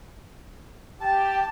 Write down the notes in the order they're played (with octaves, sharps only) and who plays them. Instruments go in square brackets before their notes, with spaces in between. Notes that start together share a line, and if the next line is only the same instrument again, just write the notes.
[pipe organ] G4 [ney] G5 [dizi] A5